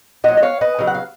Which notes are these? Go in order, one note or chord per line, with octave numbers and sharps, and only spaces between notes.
A#2 F#3 D#5 F#5
D#5
C#5 F5
B4 D#5
C#3 F#3
F#5
F5